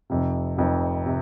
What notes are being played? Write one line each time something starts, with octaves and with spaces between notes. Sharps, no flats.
F1 F2 C3
F1 F2 C3
C3